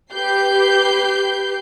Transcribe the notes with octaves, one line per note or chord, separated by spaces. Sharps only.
G4 B4 G6 C7